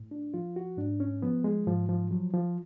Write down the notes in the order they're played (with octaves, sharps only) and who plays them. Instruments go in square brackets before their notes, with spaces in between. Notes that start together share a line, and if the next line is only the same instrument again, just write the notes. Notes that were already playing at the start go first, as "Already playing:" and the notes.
Already playing: [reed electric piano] A2
D4
F3 F4
F#4
G#2 D4
C#4
F3 B3
G#3
G#2 F3
F3
F3 F#3
F3